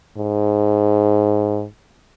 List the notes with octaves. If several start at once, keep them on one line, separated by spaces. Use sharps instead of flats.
G#2